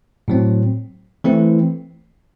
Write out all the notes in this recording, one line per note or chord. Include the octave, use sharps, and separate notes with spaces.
A2 F#3 C4
E3 A3 C4 E4